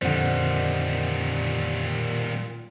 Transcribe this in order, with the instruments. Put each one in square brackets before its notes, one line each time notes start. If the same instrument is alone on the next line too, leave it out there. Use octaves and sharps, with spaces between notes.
[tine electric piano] F2 D3 [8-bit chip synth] A#2 [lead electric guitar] D#3 G3 [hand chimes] C5 F#5